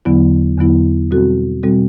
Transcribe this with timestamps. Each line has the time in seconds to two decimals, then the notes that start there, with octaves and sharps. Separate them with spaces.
0.05 E2 D3 F#3 B3 E4
0.58 E2 D3 F#3 B3 E4
1.11 B2 G3 C4 F#4 A4
1.63 B2 G3 C4 F#4 A4